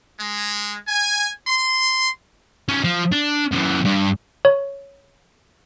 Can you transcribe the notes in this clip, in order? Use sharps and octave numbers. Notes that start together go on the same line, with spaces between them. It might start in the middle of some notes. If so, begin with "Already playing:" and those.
G#3
G#5
C6
C#4 D#4
F3
D4
F#2 E3
G2
C#5